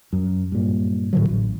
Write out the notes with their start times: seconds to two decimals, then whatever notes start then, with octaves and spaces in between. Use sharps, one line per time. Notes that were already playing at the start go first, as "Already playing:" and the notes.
0.13 F#2
0.52 G2 A#2
1.13 A2 D3 F#3
1.29 A1